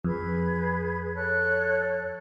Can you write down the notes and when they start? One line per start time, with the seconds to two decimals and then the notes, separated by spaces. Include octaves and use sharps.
0.04 F2 G#4 B4 G#6
1.14 A4 C#5 F#6